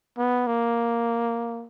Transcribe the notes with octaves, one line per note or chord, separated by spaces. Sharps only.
B3
A#3